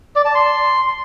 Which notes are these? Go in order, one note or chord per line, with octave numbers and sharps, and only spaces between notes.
D5
A5
C6